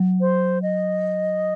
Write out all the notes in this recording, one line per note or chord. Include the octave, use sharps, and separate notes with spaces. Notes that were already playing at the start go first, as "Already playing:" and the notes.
Already playing: F#3
C5
D#5